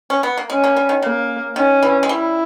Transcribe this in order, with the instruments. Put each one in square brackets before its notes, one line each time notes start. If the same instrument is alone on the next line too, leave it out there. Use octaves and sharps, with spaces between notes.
[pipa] C#4
B3
A#3
[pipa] G#3 [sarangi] C#4
[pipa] A#3
G3
D#3
[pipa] C#3 [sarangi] A#3
[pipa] D#3 [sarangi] C#4
[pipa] E3
G#3
[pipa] G3 [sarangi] E4